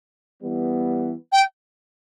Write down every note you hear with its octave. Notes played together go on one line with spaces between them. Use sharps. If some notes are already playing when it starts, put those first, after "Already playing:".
E3 G3 B3
G5